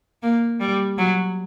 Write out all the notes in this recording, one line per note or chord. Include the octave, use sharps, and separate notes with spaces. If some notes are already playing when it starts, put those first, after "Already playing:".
A#3
G3
F#3